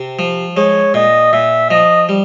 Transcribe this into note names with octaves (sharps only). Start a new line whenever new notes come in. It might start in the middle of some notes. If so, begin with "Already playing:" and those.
Already playing: C3
F3
G#3 C#5
A#2 D#5
A#2 E5
F3 D#5
G3